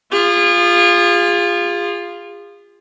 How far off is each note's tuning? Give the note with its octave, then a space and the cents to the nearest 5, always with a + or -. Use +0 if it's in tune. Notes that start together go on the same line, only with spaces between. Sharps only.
F4 +0 G#4 -35